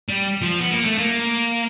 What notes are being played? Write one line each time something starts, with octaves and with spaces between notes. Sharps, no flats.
G3
F3
B3
A#3
A3
A#3